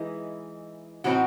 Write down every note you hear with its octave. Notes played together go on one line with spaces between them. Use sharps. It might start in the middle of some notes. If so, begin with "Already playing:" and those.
Already playing: E3 G#3 D#4 E4
A2 E3 C4 D#4 F#4